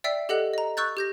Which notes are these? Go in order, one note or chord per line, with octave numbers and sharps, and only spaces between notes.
D5 E5 G5 E6 B6 C7
G4 A4 D#5 F#5 F#6 F#7
D#5 A#5
C#6 E6 F#6 G6 A6
G4 G6 A#6